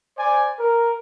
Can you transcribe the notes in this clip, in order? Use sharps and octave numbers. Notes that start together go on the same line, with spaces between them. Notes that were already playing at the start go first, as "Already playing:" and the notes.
C5 D5 G#5
A#4